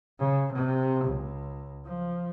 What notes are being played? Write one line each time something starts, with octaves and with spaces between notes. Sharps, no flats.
C#3
C3
C#2
F3